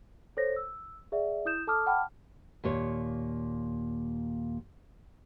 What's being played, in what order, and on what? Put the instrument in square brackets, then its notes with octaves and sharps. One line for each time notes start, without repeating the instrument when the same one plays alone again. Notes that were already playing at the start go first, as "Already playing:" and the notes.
[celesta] A4 C5 C#5 A#6
E6
G#4 D5 E5 F#5
E4 D#6 G6 E7
A4 A5 D6 D#6 F6
F#5 G5 A5 B5 D6 F6
[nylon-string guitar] D#2 A#2 C#5